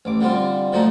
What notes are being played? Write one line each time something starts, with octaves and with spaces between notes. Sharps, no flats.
A1 D6
D3 G3 C4 F4
A#2 F3 F#3 A3 D#4